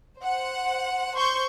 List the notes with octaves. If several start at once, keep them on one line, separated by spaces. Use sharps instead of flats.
C5 F#5
C5 C6 C#6 G6